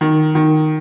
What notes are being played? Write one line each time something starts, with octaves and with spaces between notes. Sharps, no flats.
D#3
D#3